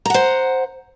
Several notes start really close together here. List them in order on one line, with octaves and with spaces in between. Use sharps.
A#5 F#5 C5